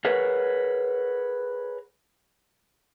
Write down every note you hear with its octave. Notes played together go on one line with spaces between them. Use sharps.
G#4 A#4 B4 C#5 F#5